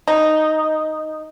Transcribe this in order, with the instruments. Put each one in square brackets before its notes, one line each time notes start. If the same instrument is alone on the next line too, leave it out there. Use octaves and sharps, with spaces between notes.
[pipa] D#4